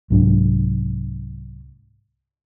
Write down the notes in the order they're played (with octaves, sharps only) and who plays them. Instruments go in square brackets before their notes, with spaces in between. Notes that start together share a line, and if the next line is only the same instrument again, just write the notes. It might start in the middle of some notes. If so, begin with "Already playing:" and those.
[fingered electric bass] C2 G#2 F#3 D4